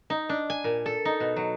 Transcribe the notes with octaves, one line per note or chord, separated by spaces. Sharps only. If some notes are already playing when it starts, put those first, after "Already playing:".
D#4
D4
G#5
A#2
A4
D#4
B2
F#3